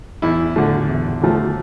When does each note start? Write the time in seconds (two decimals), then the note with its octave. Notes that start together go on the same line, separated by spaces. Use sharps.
0.22 E2 E4
0.56 D3 F3 A3
0.89 E2
1.21 D3 F3 A3